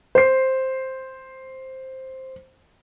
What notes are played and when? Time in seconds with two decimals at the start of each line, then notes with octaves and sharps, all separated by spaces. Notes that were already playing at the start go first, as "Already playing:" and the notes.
0.15 C5 C7